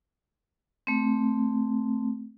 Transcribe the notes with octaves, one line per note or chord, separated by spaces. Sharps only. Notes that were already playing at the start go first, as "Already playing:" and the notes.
A3 C4